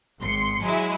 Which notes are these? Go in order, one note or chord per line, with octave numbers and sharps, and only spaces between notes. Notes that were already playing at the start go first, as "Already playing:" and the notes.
G#1 C6 C#7
F#3 G#3 E4